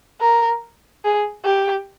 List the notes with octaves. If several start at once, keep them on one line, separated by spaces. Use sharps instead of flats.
A#4
G#4
G4